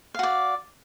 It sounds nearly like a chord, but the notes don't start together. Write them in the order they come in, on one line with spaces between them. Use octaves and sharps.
F5 F#4 D5